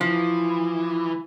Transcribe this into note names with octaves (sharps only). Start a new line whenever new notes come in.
E3 F3